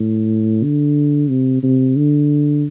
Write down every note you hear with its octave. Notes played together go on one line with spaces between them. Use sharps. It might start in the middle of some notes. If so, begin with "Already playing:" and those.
Already playing: A2
D3
C3
C3
D3